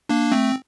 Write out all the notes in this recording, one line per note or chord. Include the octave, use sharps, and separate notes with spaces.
A#3 D4
A3 C4